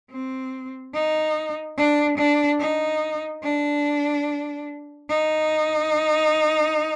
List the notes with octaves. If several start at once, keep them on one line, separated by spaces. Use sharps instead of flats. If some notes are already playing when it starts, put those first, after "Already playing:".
C4
D#4
D4
D4
D#4
D4
D#4